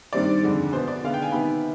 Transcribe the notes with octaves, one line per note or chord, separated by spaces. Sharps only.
G2 D#3 G3 C4 D5
F2 D3 G#3
B2 B3 C5
D5
D3 G#3 B3 F5
G5
G#5
C3 D#3 B3 B5